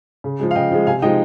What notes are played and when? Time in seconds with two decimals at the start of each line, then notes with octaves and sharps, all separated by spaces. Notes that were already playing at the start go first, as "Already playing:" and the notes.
0.24 C#3
0.40 F3 G#3
0.51 F5
0.55 C#3 D#5 G5
0.71 F3 G#3
0.87 C3 F5 G#5
1.02 F3 G#3 D#4 D#5 G5